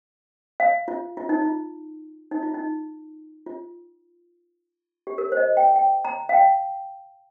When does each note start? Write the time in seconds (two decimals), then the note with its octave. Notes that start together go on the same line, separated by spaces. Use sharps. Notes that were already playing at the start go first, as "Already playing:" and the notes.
0.60 F5
0.88 F4
1.17 F4
1.29 D#4
1.42 F4
2.31 D#4
2.43 F4
2.54 D#4
3.46 F4
5.07 G4
5.18 A#4
5.32 C5
5.37 D#5
5.57 G5
5.76 G5
6.05 A#5
6.29 F5
6.33 G5